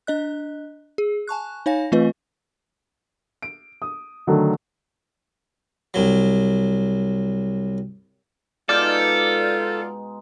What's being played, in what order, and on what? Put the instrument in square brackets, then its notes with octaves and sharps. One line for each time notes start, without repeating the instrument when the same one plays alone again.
[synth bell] D4 D#5 F#6
G#4
G#5 A5 C#6 F#6
D#4 C#5 F5 G#5 A#6
E3 A3 C4 F4 B4 D#5
[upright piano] D7
D#6
D3 D#3 F#3 A3
[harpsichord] C2 F#3
[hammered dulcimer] B2 G#3 D#4 [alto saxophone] F4 [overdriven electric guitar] A4 [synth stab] D5 F6 G6